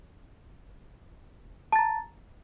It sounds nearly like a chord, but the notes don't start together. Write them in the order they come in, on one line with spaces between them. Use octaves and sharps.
A5 A6 A#5